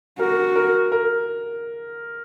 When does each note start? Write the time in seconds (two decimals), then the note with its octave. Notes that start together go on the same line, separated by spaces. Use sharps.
0.19 F#4 A#4
0.56 A#4
0.92 A#4